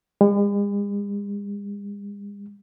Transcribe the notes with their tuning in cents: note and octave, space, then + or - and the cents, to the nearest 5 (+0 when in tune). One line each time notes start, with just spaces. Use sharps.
G#3 -45